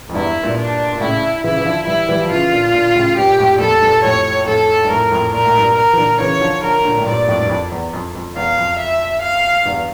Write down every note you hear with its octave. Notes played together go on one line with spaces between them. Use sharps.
F2
E2 G2 E4
G2 A#2
D4
A#2
A2 C#3 E4
C#3 E3 E4
E3
D3 F3
E3 G3 E4
E3 G3
F3
C#3 E3 F4
A#2 D3
A#2 D3
A2 C#3
G2 A#2 G4
F2 A2
A#2
F2 A2 A4
G2 A#2
F2 A2 C#5
F2 A2 A4
G2
F2 A2 A#4
F2 A2
A#2 A#4
A2
G2 A#2
A#4
E3
A#2 D3
C#3 E3 C#5
D3 F3
D3 F3 A#4
A#2 D3
A2
G2 A#2 D5
F2 A2
G2
F2
E2
F2
F2
E2 F5
F2
E5
F5
E2 G2